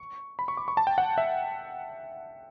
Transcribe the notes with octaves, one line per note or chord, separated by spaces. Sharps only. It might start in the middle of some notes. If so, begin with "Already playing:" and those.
Already playing: C#6
B5
C#6
D6
C#6
A5
G5
F#5
E5